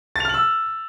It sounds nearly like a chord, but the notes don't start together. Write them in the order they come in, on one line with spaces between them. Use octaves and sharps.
A6 F7 F6 F#7 E6